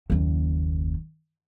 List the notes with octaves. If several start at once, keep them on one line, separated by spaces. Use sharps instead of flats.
F#1 D#2